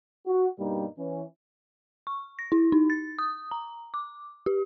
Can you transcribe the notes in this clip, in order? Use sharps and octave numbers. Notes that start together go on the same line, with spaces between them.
F#4
G2 B2 G3 A#3 D#4
E3 C#4
C#6
A#6
E4
D#4
A6
D#6
A#5
D6
G4